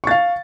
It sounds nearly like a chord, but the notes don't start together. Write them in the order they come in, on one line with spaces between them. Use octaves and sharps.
C#6 A6 F5